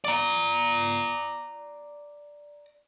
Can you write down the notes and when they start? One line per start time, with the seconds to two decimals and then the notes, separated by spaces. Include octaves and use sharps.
0.04 D5 A#5